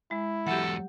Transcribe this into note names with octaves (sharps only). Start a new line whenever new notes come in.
G#3 E4
E2 F#3 G4 A4 F#5